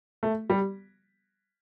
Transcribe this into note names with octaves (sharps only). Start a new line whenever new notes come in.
A3
G3